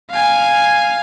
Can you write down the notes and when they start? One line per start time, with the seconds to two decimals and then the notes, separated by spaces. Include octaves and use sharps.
0.10 F5 G#5